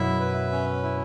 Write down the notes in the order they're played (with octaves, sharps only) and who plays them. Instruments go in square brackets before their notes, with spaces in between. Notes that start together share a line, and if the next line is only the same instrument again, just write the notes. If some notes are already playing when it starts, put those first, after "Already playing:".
Already playing: [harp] F#2 B2 [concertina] E4 E5
[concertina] B4
C#4
E4